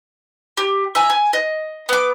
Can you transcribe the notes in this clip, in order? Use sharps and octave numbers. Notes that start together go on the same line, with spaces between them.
G4
E5 G#5 A#5
G#5
D#5
B3 D6